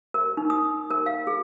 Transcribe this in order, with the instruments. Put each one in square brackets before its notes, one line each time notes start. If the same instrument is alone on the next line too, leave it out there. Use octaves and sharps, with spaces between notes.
[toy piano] A#4
D#4
D#6
A#4
F5
G#4